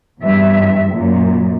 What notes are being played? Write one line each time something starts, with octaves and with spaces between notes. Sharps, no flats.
E2 G2 E5
F#2 A#2